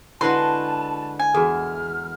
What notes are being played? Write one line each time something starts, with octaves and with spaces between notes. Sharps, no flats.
D3 G#3 E4 F#4 B4 A5 C6
G#5
E2 F#4 G#4 A4 F6